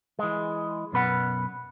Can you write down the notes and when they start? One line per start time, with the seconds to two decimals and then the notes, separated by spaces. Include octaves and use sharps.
0.19 E3 G#3
0.92 F#2 B2 B4 F#5